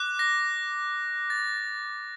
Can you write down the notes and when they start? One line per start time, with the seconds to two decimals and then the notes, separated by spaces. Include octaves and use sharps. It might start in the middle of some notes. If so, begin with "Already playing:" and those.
Already playing: D6 F#6
0.19 A#6
1.30 A6